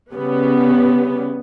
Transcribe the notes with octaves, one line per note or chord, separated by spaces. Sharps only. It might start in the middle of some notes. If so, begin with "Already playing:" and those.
C#3 G3 B3 C#4